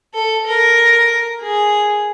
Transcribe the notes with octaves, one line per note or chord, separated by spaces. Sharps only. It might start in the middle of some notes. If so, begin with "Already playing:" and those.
A4
A#4
G#4